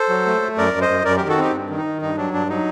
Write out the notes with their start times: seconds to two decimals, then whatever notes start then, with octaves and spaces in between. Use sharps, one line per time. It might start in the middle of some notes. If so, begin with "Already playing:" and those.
Already playing: A4 C5
0.09 F#3
0.26 A3
0.42 A3
0.58 F#2 A#4 D5
0.73 F#2
0.81 C5 D#5
0.89 F#2
1.05 F#2 A#4 D5
1.17 D#3 G4 A#4
1.29 F#4 A4
1.37 C4 D#4 G4
1.53 G2
1.70 D#3
1.78 D#4
1.85 D#3
2.02 G2 D#4
2.17 F#3 D4
2.34 G2 D4
2.49 F#3 D#4